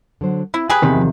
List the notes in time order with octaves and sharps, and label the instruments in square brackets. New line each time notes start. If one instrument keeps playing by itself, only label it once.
[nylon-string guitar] D3 F#3 C5
[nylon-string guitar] C4 [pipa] E4
[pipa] G4 G#4 B4 [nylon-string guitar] G#5
[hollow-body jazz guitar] E2 C3 D#3
[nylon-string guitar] F3